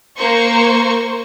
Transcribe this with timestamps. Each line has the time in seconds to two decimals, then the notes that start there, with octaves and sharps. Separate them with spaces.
0.17 A#3 C5 C#6